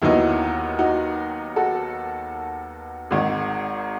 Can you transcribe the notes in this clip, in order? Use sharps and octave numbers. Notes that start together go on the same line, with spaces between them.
D#2 D#3 F#3 B3 D#4 E4
D#4 F#4
F#4 A4
G#1 G#2 D#3